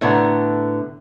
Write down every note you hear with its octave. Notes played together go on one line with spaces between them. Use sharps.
A2 D3 B3 A#5